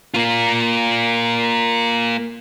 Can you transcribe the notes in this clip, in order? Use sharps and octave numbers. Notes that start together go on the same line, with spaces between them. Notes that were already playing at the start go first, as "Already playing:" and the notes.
A#3 F4